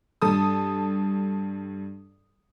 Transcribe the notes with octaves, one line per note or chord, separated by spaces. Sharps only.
G2 A4 A5 D#6